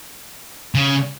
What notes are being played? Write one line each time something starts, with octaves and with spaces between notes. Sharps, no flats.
C#3